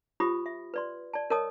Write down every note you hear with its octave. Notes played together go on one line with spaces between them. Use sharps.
F4 G4 C5 B5 D#6
E5
B4 D5 C6
D5 A5
A#4 C#5 D#5 A5 D#6